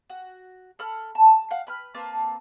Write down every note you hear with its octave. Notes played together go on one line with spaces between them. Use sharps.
F#4
A4 B5 F6
A5
F5 F#5
B4 B5 F6
A#3 C4 B4 A5